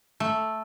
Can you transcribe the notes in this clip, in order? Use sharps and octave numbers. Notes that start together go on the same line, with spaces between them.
A3